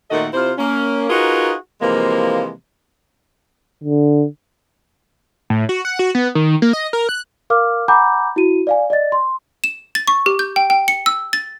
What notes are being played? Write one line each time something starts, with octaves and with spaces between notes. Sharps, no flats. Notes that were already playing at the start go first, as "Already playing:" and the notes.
A#2 D#3 A3 F#4 A4 D#5
C3 E4 F4 C5
A#3 C#4
D#4 F4 F#4 G#4 A#4 B4
C3 E3 F3 G#3 A#3
D3
A2
F#4
F#5
F#4
B3
D#3
A#3
D#5
A#4
F#6
A#4 F5 D6 F6
F#5 G#5 A#5 B5 D6 G6
E4 F#4 D#7
D5 F5 G#5
D5 D#5 A6
C6
E7
A6
C#6
G4
G6
G5
G5
C#7
E6
A6